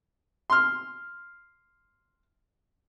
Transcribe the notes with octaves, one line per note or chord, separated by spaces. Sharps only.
C6 F6